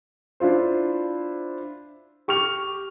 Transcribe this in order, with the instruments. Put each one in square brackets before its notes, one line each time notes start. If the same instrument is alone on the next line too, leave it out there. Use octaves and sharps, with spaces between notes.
[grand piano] D4 E4 F4 C5
G4 C#6 F6 F7